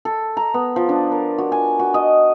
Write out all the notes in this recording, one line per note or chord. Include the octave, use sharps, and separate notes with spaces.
A4
A#5
B3
F3
D4
A#4
F#4
G#5
F#4
D#5